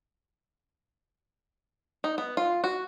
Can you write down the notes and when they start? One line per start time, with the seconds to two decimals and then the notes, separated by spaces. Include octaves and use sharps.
2.04 D#4
2.18 B3
2.37 F4
2.64 F#4